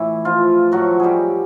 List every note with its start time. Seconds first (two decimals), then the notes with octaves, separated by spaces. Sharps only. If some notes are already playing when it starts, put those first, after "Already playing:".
Already playing: A2 E3 E4
0.25 F3 F4
0.72 A2 F3 F#3 F#4
1.00 G3 G4 G#4